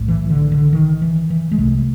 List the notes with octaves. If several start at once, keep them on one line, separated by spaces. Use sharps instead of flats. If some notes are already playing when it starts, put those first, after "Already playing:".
Already playing: B1 A2
E3
D3
D3
D#3
E3
E3
G#3
C2 C3 A3